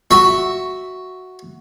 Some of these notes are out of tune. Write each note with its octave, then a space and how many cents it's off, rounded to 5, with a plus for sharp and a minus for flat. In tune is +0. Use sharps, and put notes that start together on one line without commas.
F#4 +0 E5 +0